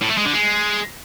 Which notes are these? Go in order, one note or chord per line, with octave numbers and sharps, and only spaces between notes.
A2
A3
G#3
D3
G#3